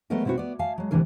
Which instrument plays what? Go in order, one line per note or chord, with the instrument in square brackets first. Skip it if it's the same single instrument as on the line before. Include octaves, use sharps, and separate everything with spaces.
[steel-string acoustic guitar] F#3 G#3 A3 B3 A#4 D#5
B2 B3 C4 E4 F#4
B3 D5
E5 F5 G#5 A5
F#3 G#3
D2 A2 C3 E3 D4 A#4